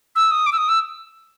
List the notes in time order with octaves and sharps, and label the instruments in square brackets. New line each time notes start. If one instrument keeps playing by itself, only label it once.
[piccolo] E6
D#6
D6
E6
D#6
E6